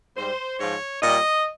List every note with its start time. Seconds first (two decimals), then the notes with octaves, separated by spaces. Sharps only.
0.17 G#2 G3 C5
0.59 G#2 F3 C#5
1.02 A#2 G3 D#5